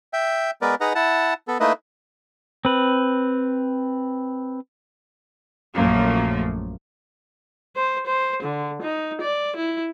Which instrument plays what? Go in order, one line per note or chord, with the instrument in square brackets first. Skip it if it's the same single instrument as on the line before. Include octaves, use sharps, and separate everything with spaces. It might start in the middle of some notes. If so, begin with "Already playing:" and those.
[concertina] E5 G5
G#3 B3 A#4 B4 D5
D#4 G#4 B4 D#5 F#5 A#5
E4 F#5 A5
B3 A4
A3 A#3 D#4 E4 B4 D#5
[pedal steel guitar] C4 B4
[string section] A#1 F#2 F3 A3 A#3
[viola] C5
C5
D3
D#4
D5
E4